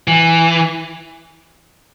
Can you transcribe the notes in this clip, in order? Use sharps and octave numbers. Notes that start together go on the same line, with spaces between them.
E3